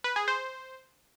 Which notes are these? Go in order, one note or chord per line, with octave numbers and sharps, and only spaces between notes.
B4
G#4
C5